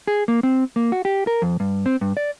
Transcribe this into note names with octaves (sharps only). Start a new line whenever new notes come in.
G#4
A#3
C4
A#3
F#4
G4
A#4
F2
G2
C4
G2
D5